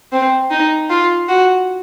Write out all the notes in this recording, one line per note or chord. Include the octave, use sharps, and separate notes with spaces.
C4
D#4
F4
F#4